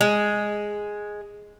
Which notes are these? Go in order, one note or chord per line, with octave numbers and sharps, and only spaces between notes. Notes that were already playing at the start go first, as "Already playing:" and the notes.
G#3